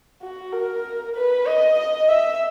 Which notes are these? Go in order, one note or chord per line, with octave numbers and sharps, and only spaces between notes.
F#4
A#4
B4
D#5
D#5
E5